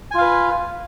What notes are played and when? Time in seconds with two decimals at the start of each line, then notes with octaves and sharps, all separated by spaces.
0.11 G#5
0.14 F4
0.18 F5
0.21 B4